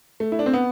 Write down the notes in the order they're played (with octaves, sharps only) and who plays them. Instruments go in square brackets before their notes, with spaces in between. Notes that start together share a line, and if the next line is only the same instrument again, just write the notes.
[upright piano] A3
E4
D4
C4
B3